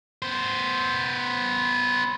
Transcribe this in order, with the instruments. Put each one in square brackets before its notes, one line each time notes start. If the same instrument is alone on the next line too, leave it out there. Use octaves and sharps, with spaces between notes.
[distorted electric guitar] B3 C5